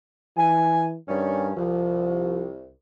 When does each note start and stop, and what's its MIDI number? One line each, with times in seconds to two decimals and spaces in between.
0.37 0.97 52
0.37 0.85 80
1.08 1.54 43
1.08 1.50 51
1.08 1.50 55
1.08 1.50 61
1.57 2.69 36
1.57 2.48 53